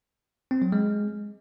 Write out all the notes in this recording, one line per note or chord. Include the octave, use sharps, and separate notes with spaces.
C4
F#3
G#3